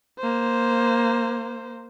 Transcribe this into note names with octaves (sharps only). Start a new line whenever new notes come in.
A#3 C5